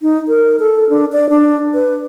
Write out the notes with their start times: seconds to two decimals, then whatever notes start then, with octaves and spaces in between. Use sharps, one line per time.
0.02 D#4
0.28 A#4
0.60 A4
0.90 D4
1.12 D5
1.30 D4
1.74 B4